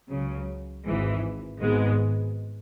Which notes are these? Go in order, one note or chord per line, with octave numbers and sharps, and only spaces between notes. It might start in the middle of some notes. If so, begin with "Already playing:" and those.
C#2 C#3 F#3
G#1 G#2 E3
G#1 G#2 G#3 B3